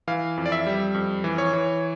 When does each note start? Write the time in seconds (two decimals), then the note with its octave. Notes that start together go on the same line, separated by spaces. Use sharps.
0.08 E3 F5
0.37 F2
0.46 D5
0.52 E5
0.66 G3
0.94 F2
1.24 E3
1.38 C#5
1.53 E3